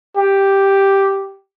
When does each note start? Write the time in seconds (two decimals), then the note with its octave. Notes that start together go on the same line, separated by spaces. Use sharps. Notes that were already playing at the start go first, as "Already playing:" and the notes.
0.17 G4